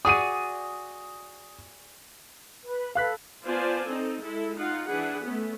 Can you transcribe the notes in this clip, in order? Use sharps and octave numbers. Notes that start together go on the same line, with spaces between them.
F#4 G#4 D5 D#6 D#7
B4
A4 B4 F5 F#6 B6
B3 F4 C5 D5 G#5 A5
C4 D#4 A4
G#3 E4 A4
D#4 F4 F5 F#5
E3 D4 G#4 B4 F#5
A3 B3 C#4